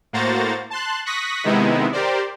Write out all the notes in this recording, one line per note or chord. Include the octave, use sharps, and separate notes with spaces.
A2 A#3 F#4 C5 A#5 A6
A5 C6 F#6
C#6 D#6 F#6 A#6 B6
C3 D#3 G#3 B3 D#4 E4
G4 A#4 C5 D5